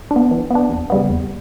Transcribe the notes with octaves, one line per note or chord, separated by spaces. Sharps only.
D4
B3
E3
B3 D4
E2
C#3 G3 B3
E2